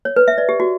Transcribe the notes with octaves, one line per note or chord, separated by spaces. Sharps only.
C#5
B4
E5
D5
G4
F#4